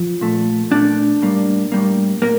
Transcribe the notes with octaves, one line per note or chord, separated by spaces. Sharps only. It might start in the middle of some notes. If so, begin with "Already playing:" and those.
Already playing: F3
A#2 A3
A#2 A3 D4
A2 G3 A#3
A2 G3 A#3
A2 A#3 A#4